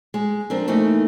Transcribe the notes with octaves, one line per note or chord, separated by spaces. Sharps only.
G#3
F3 C4 D4 A#4
E3 A3 A#3 D#4